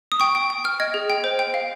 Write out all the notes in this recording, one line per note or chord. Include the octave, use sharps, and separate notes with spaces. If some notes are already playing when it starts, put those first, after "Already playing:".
D#6
G5 C#6
G5
G5
G5 F6
D#5 G#6
G#4
G5
C5
G5
F5